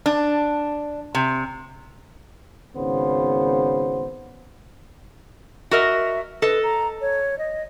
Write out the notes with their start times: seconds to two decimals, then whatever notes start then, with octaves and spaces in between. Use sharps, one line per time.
0.06 D4
1.15 C3
2.75 G#1 C#3 B3 C5
5.71 F#4 A#4 D#5 E5
6.42 A4 B4 D#5
6.63 A#5
7.01 C#5
7.39 D#5